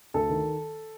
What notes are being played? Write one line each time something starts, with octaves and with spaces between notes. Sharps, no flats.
D2 A4
D#3